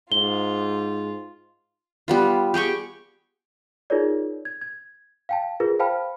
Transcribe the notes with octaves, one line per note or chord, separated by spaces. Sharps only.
G#2 F4 G7
G3 B3 F4
G4 G#4 G5 C#6
D#4 F4 G#4 A#4 C#5 D5
G#6
G#6
F5 G5 A5
F4 G#4 A#4 B4
C5 F5 G5 A5 B5 F6